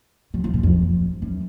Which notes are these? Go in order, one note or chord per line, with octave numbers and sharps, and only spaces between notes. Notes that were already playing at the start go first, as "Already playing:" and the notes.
F#3
F3
A#2
F2
F#2